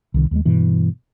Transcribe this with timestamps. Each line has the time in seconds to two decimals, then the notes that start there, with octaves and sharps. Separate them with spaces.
0.14 C2 D#3
0.31 D#2 F#3 G#3
0.45 G2 B2 E3